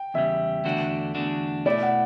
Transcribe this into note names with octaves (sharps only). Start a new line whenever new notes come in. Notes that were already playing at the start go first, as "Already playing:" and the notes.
Already playing: G5
E2 C#3 G3 E5
E2 D3 A3 D4 F#4
E2 D3 A3 D4 F#4
B2 A3 E4 D5
F#5